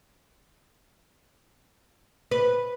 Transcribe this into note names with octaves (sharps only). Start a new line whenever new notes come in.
B4